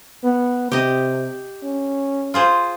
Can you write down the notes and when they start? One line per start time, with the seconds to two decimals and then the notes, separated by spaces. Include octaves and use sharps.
0.24 B3
0.72 C3 G4 D#5
1.63 C#4
2.34 F4 G#4 C5